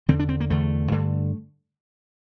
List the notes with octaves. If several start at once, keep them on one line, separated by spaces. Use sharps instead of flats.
E2 D3 C4
D4
C4
A#3
E2 D3 A3
G2 D3